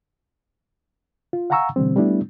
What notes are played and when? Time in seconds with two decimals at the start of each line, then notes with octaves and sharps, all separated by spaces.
1.33 F4
1.50 F5 F#5 G#5 A#5 C#6 E6
1.76 B2 D3 E3 G3 C4
1.96 G3 A3 B3 D4 E4